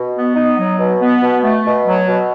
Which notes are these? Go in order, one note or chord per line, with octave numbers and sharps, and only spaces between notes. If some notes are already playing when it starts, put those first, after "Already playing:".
Already playing: B2
B3
D#4
F#3
B2
B3
B2
A3
B2
F#3
B2